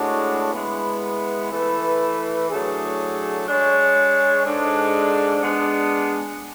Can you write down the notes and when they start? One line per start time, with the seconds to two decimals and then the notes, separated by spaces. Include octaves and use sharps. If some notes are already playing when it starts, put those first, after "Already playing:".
Already playing: A2 G#3 D4 F#4 C#5
0.52 G#3 B3 E4 B4
1.51 E3 A3 E4 B4
2.49 A2 F#3 A3 D4 G#4
3.46 G#3 D4 G#4 C#5
4.44 G#2 G#3 D4 A4
5.41 G#3 B3 D4